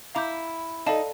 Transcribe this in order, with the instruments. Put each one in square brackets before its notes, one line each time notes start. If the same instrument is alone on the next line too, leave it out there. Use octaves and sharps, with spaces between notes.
[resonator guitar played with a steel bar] E4 [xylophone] F5 A#5 D6 G6
[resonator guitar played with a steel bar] D#4 [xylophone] A4 D5 F5 A5